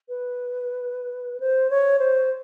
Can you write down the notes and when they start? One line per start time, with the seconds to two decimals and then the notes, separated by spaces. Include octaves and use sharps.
0.09 B4
1.40 C5
1.70 C#5
1.99 C5